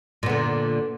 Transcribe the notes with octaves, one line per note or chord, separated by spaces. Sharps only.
A#2 D3 B3